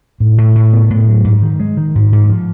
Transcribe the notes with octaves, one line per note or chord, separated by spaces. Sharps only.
A2
A2
A2
B3
A2
F#3
G#2
D#3
G#3
D#3
G#2
G#2
F3